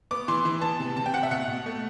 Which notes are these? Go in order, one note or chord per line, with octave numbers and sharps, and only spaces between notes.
B3 D6
E3 C6
E3
B3 A5
C3
C3 A5
G5
C3 F#5
E5
B2 F#5
B2
A3